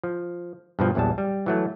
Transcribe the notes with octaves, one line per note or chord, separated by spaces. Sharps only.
F3
G2 B2 F3
A#1 E2 F#3 G3 A5
G3
E3 F#3 A3